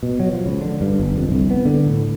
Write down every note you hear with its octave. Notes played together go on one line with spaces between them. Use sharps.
B2
F#3
F3
C#2
D3
G2
G1
F2
C2
B3
D3
A2